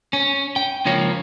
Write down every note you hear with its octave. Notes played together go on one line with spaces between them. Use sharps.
C#4
G5
C#2 C#3 F3 A#3 C#5